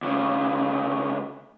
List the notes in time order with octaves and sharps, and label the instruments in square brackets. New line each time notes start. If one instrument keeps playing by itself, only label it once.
[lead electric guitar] D2 C#3